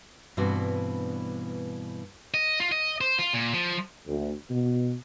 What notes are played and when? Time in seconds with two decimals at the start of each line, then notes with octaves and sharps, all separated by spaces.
0.37 G2 B2 E3 C4 D4 F#4
2.34 D#5
2.60 F4
2.72 D#5
3.01 C5
3.19 F4
3.33 A#2
3.54 F3
4.07 D2
4.50 B2